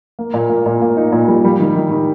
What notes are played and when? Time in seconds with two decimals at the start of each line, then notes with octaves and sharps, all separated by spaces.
0.19 A#3
0.34 A#2
0.50 A#3
0.66 A#2
0.82 A#3
0.97 D#4
1.12 A#2
1.28 G3
1.44 G3
1.60 D#3
1.76 D#3
1.91 D#3